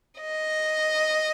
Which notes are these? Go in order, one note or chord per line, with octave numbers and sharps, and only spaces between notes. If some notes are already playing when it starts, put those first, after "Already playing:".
D#5